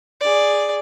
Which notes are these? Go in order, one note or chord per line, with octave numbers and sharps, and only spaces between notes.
G#4 D5